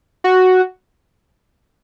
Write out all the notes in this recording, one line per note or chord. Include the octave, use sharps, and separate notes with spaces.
F#4